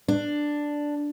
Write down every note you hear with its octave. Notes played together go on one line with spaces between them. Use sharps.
D4